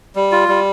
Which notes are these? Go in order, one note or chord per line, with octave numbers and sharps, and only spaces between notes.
G3
F4
G3